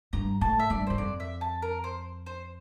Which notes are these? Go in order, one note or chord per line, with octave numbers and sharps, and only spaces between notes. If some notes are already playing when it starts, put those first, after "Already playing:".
G2 A#5
A2 A5
E5
G2 D5
G2 C5
F2 D5
E5
A5
A#4
C5
C5